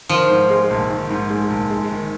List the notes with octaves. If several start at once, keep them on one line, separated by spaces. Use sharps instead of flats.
D#3 F3
G#2
G#3
A#1
D#3
G#2
G#3
A#1
G#3
D#3